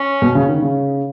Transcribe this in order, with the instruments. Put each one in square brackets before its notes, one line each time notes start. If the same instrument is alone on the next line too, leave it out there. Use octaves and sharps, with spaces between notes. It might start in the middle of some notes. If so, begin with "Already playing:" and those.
Already playing: [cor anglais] C#4
[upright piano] B2
C#3
D#3
C#3